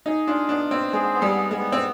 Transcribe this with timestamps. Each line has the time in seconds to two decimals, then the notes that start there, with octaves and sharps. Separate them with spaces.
0.06 D#4 G#4
0.27 D4 F4
0.49 B3 D4
0.71 C4 C5
0.93 G#3 G#4
1.14 B3
1.22 G3
1.36 B3
1.51 G#3
1.58 B3
1.72 C4